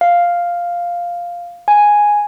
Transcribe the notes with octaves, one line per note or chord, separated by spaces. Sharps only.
F5
G#5